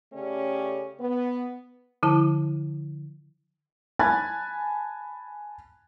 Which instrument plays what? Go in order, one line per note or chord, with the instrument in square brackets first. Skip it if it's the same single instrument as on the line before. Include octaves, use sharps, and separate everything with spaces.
[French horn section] C#3 A3 C#4 G4 D5
B3
[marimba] D3 F3 E4 A5
[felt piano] G#5 A5 B5 F#6 G#6 A6